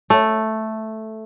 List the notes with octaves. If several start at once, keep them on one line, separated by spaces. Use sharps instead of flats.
A3